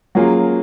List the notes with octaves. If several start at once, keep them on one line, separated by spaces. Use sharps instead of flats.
F#3 A#3 C#4 F4 G#4